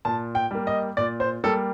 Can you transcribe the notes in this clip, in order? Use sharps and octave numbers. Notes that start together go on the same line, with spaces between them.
A#2 A5
G5
G3 A#3
D#5
A#2 D5
C5
G3 A#3 A4